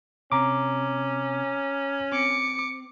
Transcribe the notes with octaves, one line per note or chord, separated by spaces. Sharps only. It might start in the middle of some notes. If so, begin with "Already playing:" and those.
C3 C#4 A#5 D6
C4 D6 C#7